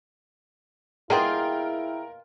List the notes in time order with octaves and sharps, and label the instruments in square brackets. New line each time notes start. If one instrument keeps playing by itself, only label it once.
[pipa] B2 A#3 F4 [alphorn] E4 [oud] G#4 [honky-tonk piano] A#4 G5